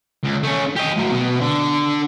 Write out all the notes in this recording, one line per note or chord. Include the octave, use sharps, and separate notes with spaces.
C#2
A3 C#4
G4 D#5
A2 F#3
B2 B3
D3